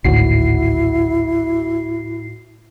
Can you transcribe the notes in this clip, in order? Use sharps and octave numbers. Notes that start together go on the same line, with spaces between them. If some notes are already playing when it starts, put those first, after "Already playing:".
G#1 D2 A2 E4 F#4 C7